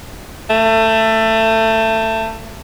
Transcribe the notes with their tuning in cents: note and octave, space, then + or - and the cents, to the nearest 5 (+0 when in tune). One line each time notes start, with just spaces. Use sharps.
A3 +20